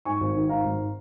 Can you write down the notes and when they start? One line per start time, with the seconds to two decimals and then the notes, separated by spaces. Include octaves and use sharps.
0.05 G#2 G#5 C#6
0.20 G#1
0.35 D#3
0.49 G#2 F5 A#5
0.64 G#1